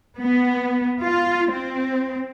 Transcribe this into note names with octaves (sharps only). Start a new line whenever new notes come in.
B3
F4
C4